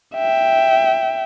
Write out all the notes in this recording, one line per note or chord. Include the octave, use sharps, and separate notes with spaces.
E5 G5